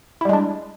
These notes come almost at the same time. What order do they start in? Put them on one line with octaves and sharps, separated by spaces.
E4 G3 G#3 D4